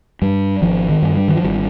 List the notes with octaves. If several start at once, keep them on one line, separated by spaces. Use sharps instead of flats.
G2 G3
G#1 F3
D#3
G2
G3
D#3
F3
G#1 G3